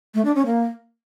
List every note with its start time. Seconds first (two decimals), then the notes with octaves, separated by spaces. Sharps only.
0.14 A3
0.25 D4
0.35 C#4
0.46 A#3